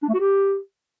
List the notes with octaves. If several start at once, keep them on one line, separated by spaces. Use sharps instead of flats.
D4
A3
F#4
G4